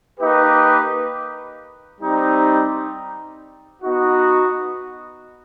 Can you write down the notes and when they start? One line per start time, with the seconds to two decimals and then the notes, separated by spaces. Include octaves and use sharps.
0.19 A#3 D#4 G4 B4
2.01 G3 C4 D#4
3.82 B3 D#4 F#4